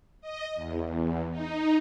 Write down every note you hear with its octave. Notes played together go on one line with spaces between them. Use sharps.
D#5
E2
E2
D#4